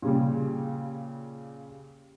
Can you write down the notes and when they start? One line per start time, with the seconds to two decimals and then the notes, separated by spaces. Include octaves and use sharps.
0.02 A#2 C#3 G3